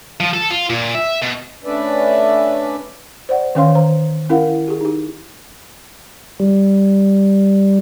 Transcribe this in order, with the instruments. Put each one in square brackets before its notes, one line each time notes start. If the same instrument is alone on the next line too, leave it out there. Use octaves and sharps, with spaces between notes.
[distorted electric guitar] F3
A4
F4
A#2
E5
B2
[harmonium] A3 C#4 D4 B4 D5 E5
[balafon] C5 D5 F#5
D#3 E3 C#4 C#5 F5 C6
C5 A#5
C#4 E4 A#4 F5 F#5
G4 G#4
D#4 G4
[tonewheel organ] G3